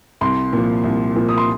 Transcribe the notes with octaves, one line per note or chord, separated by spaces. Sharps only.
C2 C6
A#2 F3
C2
A#2 F3
D#6
C6